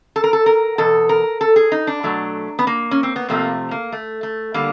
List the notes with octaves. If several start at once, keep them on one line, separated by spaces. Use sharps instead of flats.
A4
A#4
A4
A#4
E2 B2 A4
A#4
A4
G#4
D#4
D4
B2 F#3 A3
B3
A#3
C#4
C4
B3
F2 C3 F3 A3 A#3
A#3
A3
A3
D3 G3 A#3